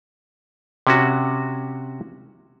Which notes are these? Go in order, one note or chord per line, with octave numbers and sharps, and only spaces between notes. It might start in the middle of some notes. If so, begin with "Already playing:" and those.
C3 C#4 F#4